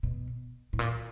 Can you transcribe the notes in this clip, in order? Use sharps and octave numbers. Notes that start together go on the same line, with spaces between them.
B2
A2
A#2